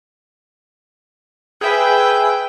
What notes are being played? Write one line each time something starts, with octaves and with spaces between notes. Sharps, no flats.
G#4 B4 E5 G5